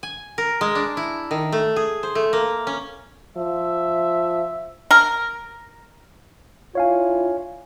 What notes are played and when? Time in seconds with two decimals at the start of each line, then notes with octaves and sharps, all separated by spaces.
0.03 G#5
0.38 A#4
0.61 G#3
0.75 D4
0.97 E4
1.31 D#3
1.52 A3
1.76 G#4
2.03 C5
2.15 A3
2.33 A#3
2.67 C#4
3.37 F3 E5
4.91 A#4
6.75 D4 E4 F4 C#5 F5 G#5